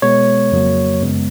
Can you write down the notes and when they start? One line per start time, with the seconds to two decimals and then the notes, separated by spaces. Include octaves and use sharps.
0.02 B2 G#3 B3 C#5
0.52 F2 C#3 F#3 A#3
1.01 F#2 C#3 G#3 B3